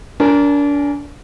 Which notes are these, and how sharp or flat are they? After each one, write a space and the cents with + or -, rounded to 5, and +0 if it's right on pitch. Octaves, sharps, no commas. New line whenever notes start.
D4 -30 A#4 +0 G#5 +0